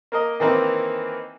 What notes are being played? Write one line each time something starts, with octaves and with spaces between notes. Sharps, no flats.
A#3 A#4 D#5
D#3 E3 A#3 C4 D#4